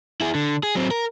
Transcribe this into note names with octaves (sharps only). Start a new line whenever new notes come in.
E4 G#4
D3
G#4
F#3 C4
A#4